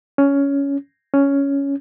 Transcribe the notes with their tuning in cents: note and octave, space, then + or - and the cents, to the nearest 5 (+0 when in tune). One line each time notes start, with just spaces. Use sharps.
C#4 +15
C#4 +10